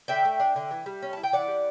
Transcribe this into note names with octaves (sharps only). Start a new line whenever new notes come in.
D3 E5 G5
A3
D4
D3
E3
G3
C#4
E4 A5
G5
E3 D5 F#5
G3